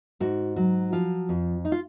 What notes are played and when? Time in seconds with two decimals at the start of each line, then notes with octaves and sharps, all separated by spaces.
0.20 G#2 F#4
0.56 F#3 F#4
0.92 F3 F4
1.29 F2
1.65 D#4
1.72 F4